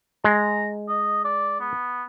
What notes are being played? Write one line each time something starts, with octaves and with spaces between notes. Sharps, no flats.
G#3 A#5
D#5
D5
B3